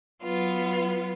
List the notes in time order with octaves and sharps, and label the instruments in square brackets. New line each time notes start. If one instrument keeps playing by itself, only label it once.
[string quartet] F#3 B3 F4